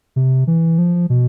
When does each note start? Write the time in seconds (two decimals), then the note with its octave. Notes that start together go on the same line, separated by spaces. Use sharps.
0.16 C3
0.47 E3
0.78 F3
1.10 B2